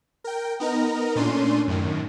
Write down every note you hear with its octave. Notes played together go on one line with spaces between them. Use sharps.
A#4 G5
B3 D#4 A#4 A#5
A#2 A3 C#4 D4 C6 D#7
F#2 A2 D#3